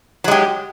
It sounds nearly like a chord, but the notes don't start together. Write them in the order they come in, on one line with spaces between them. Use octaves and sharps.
F#3 G#3 G4